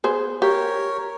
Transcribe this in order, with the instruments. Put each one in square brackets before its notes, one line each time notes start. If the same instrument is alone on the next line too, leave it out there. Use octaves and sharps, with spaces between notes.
[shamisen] B3 G#4 C5
[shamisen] G4 [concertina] A#4 C#5